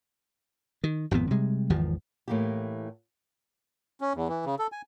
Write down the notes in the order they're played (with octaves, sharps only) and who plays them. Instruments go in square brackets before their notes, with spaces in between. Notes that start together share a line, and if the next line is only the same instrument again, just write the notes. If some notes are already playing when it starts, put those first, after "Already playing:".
[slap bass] D#3
G#1 F2 A2 B3
C3 G3 G#3
G#1 E2 D#3 F3
[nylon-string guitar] A2 E3 A#3 E4 G4
[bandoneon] C#4
E2
E3
C#3
A4
G#5